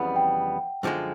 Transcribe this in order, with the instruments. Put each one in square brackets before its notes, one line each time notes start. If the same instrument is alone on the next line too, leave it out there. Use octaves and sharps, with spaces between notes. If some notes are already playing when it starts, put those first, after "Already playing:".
Already playing: [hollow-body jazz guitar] F2 C#3 E3 G3 B3 [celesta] F#5
[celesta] G5
[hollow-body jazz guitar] F#2 D3 F3 G#3